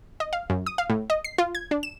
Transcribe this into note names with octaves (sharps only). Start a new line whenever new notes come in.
D#5
F5
F#2
D#6
F5
A2
D#5
C7
F4
G#6
D4
E7